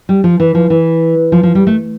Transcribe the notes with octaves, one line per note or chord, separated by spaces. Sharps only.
G3
F3
E3
F3
E3
F3
F3
G3
A3